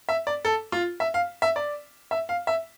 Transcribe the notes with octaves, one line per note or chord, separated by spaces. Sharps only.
E5
D5
A4
F4
E5
F5
E5
D5
E5
F5
E5